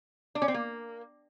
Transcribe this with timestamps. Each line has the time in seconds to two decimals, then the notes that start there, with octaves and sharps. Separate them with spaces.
0.35 D4
0.42 C#4
0.48 C4
0.54 A#3